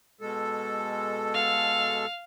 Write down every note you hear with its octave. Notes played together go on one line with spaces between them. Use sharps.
B2 G#3 A4
F5